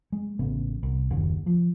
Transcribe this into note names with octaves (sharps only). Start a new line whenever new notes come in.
G#3
A1 C#3 B3
C2
F#1 D#2 D#3
F3